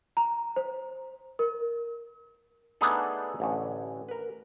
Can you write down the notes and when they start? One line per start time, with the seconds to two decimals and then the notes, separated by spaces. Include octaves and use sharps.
0.17 A#5
0.56 C5
1.39 A#4
2.81 A3 B3 D4 D#4 G#4 A4
3.40 A1 D3 C#4
4.09 A#4 B4